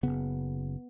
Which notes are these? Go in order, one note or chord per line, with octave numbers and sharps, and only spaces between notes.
F#1 F#2 C#3 B3